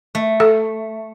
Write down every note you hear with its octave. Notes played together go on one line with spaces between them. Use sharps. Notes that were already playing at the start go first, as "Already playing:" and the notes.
A3
A4